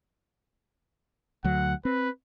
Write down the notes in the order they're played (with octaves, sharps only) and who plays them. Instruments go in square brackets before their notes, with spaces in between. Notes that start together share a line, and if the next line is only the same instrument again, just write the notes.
[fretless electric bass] D2 F#3 [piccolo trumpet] F#5
[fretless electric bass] C4 [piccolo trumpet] B4